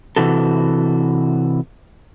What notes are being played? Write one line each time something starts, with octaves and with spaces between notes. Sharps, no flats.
C3 E3 F#4 A4